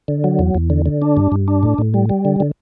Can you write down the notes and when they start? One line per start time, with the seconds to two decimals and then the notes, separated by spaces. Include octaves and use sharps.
0.08 D3
0.24 F#3
0.39 E2
0.55 E2
0.70 D3
0.86 D3
1.02 D4
1.17 G2
1.32 G2
1.48 D4
1.63 A2
1.78 A2
1.94 G3
2.09 G3
2.25 D3
2.40 D3